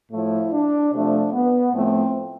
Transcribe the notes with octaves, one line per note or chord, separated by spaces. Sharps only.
A2 F3 A3 E4
D4
C3 F3 A3 D4
B3
A2 F3 A3 C4